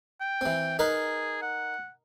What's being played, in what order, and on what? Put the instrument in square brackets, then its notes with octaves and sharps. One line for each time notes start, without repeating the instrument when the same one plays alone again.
[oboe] G5
[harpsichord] E3 C4
[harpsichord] D#4 A#4 B4 [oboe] G#4
[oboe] F#5